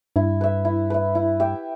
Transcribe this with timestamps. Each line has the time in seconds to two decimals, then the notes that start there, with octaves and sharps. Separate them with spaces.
0.16 G2 E4
0.41 B4 E5
0.65 E4
0.90 B4 E5
1.15 E4
1.40 G4 E5